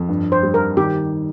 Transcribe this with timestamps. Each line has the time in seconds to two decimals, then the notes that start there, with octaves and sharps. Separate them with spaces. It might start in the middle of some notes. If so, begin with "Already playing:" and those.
Already playing: F2
0.09 G2
0.32 C5
0.43 G3
0.54 A#4
0.77 D#3 G4